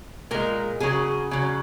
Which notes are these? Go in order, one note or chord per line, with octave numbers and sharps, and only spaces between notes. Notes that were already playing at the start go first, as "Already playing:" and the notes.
A#2 G#3 A#4
C#3 F#3 G#4
C#3 F#3